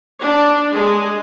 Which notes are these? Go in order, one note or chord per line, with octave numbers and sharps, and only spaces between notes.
D4
G#3